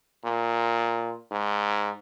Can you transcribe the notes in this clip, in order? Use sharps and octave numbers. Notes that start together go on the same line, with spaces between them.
A#2
G#2